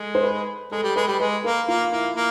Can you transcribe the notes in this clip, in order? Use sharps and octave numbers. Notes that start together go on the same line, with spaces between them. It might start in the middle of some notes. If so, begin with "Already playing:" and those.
Already playing: G#3 A4
C5
B4
G#3 A4
G3
G#3 B4
G3
G#3 B4
A#3 A#4
A#3 F4
A#3 E4
A#3